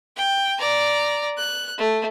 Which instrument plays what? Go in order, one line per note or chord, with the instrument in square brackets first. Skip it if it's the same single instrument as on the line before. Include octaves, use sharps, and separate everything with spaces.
[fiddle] G5
D5 A#5
F#6
A3